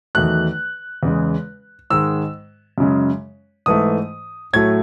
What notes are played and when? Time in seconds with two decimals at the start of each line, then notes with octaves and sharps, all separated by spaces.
0.15 E2 D#3 F#3 A3 F#6
1.03 E2 C#3 G#3
1.90 G#2 D#3 G#3 E6
2.78 F#2 C#3 G#3
3.66 G#2 E3 A3 D#6
4.53 A2 F#3 A3 G#6